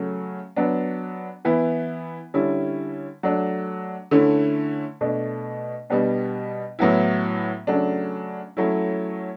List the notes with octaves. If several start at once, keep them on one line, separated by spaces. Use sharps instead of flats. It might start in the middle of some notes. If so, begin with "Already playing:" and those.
Already playing: C#3 F#3 A3
F#3 B3 D4
E3 B3 E4
D3 G3 C#4 E4
F#3 A3 D4
D3 A3 C#4 E4
B2 A3 D4
B2 G3 B3 D4
A2 F#3 B3 E4
C#3 F#3 A3 D4
F#3 A3 C#4 E4